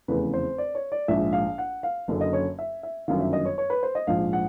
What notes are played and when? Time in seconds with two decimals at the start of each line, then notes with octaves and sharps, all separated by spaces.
0.08 F1 E2 C#3 B4
0.34 C5
0.58 D5
0.75 C#5
0.92 D5
1.08 A#1 G#2 F3 E5
1.33 F5
1.58 F#5
1.83 F5
2.08 F#1 F#2 D3
2.21 D#5
2.33 C#5
2.59 E5
2.83 E5
3.08 G1 F#2 D#3 F5
3.20 E5
3.33 D#5
3.45 C#5
3.58 C#5
3.70 B4
3.83 C5
3.95 D#5
4.07 A#1 G#2 F3 F5
4.33 F#5